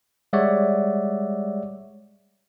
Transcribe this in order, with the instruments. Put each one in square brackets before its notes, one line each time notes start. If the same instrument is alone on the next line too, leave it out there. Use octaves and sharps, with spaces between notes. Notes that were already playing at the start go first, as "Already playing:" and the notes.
[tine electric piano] G3 G#3 C#5 D5 E5 F#5